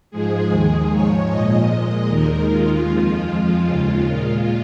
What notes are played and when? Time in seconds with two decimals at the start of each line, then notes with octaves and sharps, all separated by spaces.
0.11 G#2 F3 G#3 G#4
0.50 D#2 D#3 G#3
0.90 G#2 F3 G#3 C#5
1.29 A#2 F3 G#3 D#5
1.69 A#2 G#3
2.08 D#2 D#3 G#3 A#4
2.48 D#2 D#3 G#3 F4
2.87 F2 F3 G#3
3.27 F2 F3 G#3 F4
3.66 D#2 C#3 G#3
4.06 A#2 G#3 F4